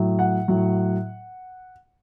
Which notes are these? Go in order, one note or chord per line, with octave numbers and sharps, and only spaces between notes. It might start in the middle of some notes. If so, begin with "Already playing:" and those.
Already playing: A2 F#3
F#5
A2 F#3